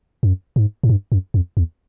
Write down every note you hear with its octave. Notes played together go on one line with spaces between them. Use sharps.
F#2
G#2
G#2
G2
F#2
F2
E2